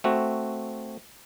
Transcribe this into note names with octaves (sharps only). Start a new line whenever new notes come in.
A3 C4 F#4